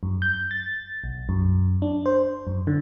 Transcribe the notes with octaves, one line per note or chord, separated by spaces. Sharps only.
F#2
G6
A6
B1
F#2
D4
C5
F#2
D3